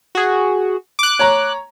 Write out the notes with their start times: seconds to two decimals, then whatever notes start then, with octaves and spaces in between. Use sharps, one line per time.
0.15 F#4 G#4
0.99 D6 F#6
1.19 C#5 A#5